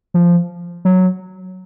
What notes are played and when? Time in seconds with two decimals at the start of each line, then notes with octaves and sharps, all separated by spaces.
0.14 F3
0.85 F#3